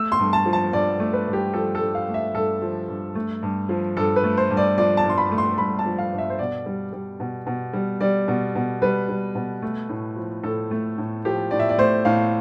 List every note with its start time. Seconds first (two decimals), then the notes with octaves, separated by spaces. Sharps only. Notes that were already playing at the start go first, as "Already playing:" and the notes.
Already playing: A3 E6
0.12 C6
0.19 G2
0.33 A5
0.45 F3
0.53 A5
0.73 G2 D5
1.00 A3
1.13 B4
1.28 G2
1.33 G4
1.54 F3 A4
1.75 A4
1.81 G2
1.95 F5
2.08 A3
2.14 E5
2.34 G2 A4
2.62 F3
2.89 G2
3.15 A3
3.43 G2
3.69 F3
3.97 G2 A4
4.16 B4
4.24 A3
4.37 C5
4.50 G2
4.57 D5
4.78 F3 D5
4.97 A5
5.04 G2 C6
5.18 B5
5.31 A3
5.38 C6
5.58 G2 B5
5.79 A5
5.86 F3
5.98 F5
6.12 G2
6.18 E5
6.30 C5
6.39 B2 D5
6.66 G3
6.93 G3
7.20 B2
7.47 B2
7.73 G3
8.01 G3 D5
8.28 B2
8.55 B2
8.82 G3 B4
9.09 G3
9.35 B2
9.62 A3
9.89 A2
10.16 F3
10.43 A2 A4
10.71 A3
10.98 A2
11.25 F3 G4
11.51 A2 D5
11.59 E5
11.69 D5
11.78 A3 C5
12.05 A2 F5